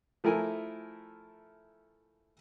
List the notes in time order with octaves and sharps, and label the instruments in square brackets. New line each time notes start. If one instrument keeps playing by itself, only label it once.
[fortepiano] F3 A3 E4 A#4 G#5